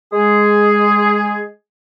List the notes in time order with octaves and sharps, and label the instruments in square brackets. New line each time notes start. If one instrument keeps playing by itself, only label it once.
[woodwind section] G#3 G#4